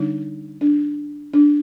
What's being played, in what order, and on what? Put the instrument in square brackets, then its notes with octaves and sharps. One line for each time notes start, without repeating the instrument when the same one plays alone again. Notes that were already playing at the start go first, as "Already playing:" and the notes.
Already playing: [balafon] D3 G3 D4 D#4
D4
D4